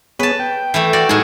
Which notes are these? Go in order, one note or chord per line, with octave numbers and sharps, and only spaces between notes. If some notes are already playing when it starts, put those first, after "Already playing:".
B3 G#4 B4 C#5 A5
G5
E3 A3
F#4 D5
A2 G#3 D#4 G#4